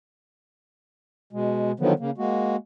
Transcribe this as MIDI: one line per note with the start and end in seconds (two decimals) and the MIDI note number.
1.33 1.72 47
1.33 1.72 56
1.80 1.93 50
1.80 1.93 51
1.80 1.93 53
1.80 1.93 54
1.80 1.93 59
2.00 2.11 49
2.00 2.11 58
2.18 2.56 56
2.18 2.56 58
2.18 2.56 66